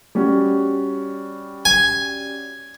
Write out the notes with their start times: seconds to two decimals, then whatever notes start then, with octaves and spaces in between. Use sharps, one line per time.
0.15 G3 C#4 F#4
1.65 G#5